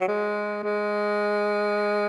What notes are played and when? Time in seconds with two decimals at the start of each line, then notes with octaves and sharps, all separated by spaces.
0.01 F#3
0.08 G#3
0.64 G#3